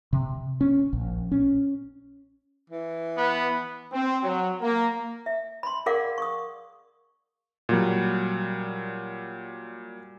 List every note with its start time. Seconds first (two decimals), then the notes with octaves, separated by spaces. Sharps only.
0.13 C3
0.61 C#4
0.93 A#1
1.32 C#4
2.70 E3
3.17 B3
3.93 C4
4.24 F#3
4.61 A#3
5.26 E5
5.63 B5 C6
5.86 G#4 A#4 D5 F5 F#5 D6
6.18 C#6 D#6
7.69 A#2 F#3 G3